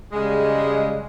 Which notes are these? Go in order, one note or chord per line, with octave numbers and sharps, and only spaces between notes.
C#3 G3 G#3